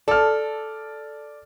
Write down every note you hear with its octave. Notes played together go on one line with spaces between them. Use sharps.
A4 D5 F6